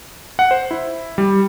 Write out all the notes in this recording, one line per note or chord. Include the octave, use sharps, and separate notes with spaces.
F#5
C5
E4
G3